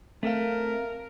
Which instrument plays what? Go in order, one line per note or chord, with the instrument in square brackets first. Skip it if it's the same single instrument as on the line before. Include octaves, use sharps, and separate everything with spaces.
[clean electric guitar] A3 [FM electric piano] C4 F5 [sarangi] A#4